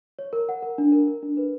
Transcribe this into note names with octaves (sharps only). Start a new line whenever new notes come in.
C#5
A#4
F#5
A#4
D4
A#4
A#4
D4
B4